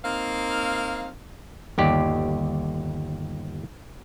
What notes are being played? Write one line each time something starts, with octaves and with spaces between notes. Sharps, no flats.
A#3 C4 D#4 F5
G1 D#2 G4 D5